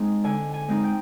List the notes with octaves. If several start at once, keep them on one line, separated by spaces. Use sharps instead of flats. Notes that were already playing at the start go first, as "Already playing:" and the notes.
Already playing: G#3 C4 D#4
D3 G#5
G#5
G#3 C4 D#4
G5